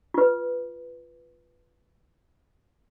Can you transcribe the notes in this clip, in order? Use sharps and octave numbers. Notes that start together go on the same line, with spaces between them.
F4 B4